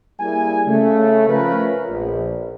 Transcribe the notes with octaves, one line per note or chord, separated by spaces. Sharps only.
G3 A#3 E4 G#4 G#5
C#3 A3
F3 C#4 F4 A#4 B4
A#1